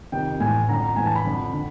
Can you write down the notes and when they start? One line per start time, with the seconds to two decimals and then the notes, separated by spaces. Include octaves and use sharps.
0.12 F2 C3 D#3 G5
0.40 A2 E3 G#5
0.69 F2 D3 A#5
0.83 A#5
0.96 A2 E3 G#5
1.06 A5
1.15 B5
1.25 F2 D3
1.53 D3